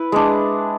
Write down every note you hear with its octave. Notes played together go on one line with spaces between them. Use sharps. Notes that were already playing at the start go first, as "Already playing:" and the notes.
Already playing: E4 B4
G#3 D4